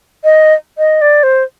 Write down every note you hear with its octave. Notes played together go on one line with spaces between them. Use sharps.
D#5
D#5
D5
C5